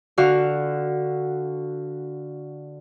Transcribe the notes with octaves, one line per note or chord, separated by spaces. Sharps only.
D3 F#4 F5